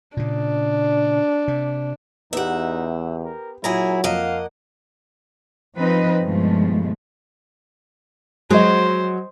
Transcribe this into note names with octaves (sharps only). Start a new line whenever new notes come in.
A#2 C#3 D4
C3
E2 B3 D#4 G4 E5 F#5
A#4
A#2 F#3 E4 G#4 A#5
F2 A#3 D#5 F5 F#5
F3 C4 D#4 B4 D#5
G2 B2 D#3 F3 G#3 A3
F#3 G#3 C5 D#5